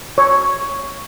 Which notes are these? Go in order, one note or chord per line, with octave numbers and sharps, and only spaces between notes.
C#5